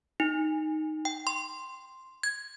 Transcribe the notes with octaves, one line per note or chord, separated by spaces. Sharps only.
D#4
G5
C6
G#6